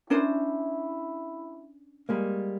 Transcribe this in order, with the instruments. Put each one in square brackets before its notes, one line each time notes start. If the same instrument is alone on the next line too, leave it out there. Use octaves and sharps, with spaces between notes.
[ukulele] C#4 D4 C5 [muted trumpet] E4
[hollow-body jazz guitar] G3 G#3 A#3